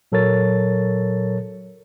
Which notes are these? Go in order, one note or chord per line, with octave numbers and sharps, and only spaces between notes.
A#2 F#3 A4 A#4 C#5 A6